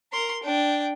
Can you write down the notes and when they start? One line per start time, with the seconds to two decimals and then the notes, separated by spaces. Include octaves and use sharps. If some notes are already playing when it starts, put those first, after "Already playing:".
0.12 A#4 C6
0.43 D4 G5